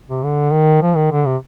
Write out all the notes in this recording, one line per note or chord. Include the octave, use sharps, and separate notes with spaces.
C3
D3
D#3
F3
D#3
D3
C3